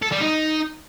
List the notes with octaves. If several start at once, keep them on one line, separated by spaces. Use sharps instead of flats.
A4
G3
D#4